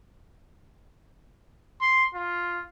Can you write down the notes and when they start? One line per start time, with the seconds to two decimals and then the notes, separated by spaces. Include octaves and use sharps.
1.81 C6
2.15 F4